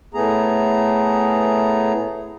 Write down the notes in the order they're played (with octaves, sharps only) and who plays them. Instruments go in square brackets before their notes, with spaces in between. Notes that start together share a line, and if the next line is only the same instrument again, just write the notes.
[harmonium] A2 A3 B3 G#4 A#5